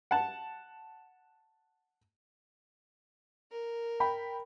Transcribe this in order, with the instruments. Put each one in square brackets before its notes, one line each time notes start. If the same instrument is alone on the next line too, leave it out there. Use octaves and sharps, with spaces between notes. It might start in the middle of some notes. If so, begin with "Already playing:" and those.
[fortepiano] F#5 A5
[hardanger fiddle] A#4
[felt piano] G5 B5